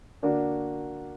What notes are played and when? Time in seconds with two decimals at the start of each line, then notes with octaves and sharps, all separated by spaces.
0.22 D3 A#3 D4 F#4